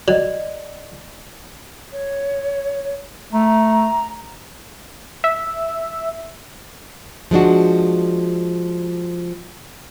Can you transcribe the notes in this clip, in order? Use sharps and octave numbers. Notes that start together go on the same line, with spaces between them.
F#3 D5 D#5
C#5
A3 A#5
E5
F3 G#3 D4 F#4